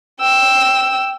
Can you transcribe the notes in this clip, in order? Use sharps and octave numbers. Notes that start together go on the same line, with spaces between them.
G5 E6